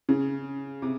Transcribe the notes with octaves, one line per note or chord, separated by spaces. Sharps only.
C#3
C3